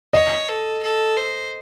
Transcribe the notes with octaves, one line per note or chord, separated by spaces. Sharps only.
C#5 D#5
A4
A4
C5